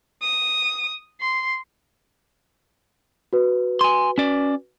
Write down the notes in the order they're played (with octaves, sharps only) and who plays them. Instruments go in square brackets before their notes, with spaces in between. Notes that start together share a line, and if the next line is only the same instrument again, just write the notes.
[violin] D#6
C6
[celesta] F#4 B4
[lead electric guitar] G#5 C6
C#4 D5